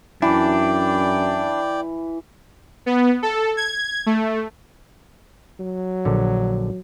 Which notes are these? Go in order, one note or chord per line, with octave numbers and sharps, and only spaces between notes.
F#2 E3 D4 D5 G5
B3
A4
G#6
A3
F#3
A#1 D3